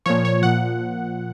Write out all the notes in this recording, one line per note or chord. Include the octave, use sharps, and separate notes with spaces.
A#2 F3 C#5
C#5
A#2 F3 F#5